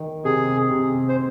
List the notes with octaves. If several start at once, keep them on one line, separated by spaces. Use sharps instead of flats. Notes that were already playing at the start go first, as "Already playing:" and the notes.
Already playing: D#3
C3 G#4
C3
C5